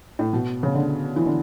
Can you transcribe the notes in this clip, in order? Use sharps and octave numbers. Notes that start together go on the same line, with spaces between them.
A2
B2
C#3
D3
E3
D3